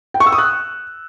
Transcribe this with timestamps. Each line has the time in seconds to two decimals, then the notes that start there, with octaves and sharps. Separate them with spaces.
0.14 G5
0.20 C#6
0.26 E6
0.32 D#6
0.38 F#6